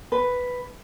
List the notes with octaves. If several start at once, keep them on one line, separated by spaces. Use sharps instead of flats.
B4